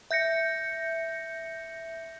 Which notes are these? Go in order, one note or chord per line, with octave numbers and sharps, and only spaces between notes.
E5 G6 A#6 C#7